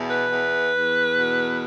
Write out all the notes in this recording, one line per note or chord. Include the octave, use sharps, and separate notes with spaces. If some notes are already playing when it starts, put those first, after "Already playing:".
Already playing: E2 B2
B4
E2
E2
B2